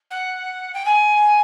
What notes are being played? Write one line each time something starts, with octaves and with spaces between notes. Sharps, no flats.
F#5
G5
G#5